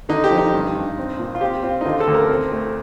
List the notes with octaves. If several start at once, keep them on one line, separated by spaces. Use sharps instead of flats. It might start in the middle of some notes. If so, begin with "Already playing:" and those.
D3 D#4
G4
F3
D#4
G2
G2
C4
A#2
F4
C4 G4
C4 F4
D#4
D3 F4
A4
D2
A#4
C4
A3